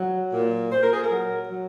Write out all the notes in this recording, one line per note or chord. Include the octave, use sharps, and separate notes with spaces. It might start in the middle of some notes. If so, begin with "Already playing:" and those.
Already playing: F#3
A#2
A#2 C5
A#4
G#4
A#4
F#3
F#3